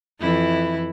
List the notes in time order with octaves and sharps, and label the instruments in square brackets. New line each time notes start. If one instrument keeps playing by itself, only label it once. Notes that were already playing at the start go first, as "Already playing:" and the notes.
[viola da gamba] F2 E3 E4